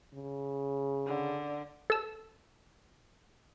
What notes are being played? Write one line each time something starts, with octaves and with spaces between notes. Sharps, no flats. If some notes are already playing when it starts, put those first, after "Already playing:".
C#3
D3
A4 E6